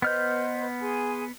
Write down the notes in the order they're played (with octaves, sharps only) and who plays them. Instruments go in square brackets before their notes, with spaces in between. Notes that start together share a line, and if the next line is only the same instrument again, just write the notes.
[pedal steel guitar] B3 F6 G6 [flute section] B4 C5 D#5
[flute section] G#4 G#5 C6